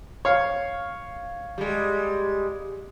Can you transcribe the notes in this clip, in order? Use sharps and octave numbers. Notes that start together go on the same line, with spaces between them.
C#5 F5
G3 G#3